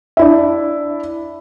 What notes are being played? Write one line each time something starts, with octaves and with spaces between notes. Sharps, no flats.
D4 E4 E5